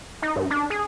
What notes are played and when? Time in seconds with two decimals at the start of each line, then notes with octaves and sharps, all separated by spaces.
0.22 D#4
0.36 G2
0.50 D4
0.70 G#4